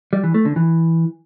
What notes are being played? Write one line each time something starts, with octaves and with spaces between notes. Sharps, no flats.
G3
E3
A3
D3
E3